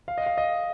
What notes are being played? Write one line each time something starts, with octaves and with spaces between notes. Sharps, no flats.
F5
D#5
F5
D#5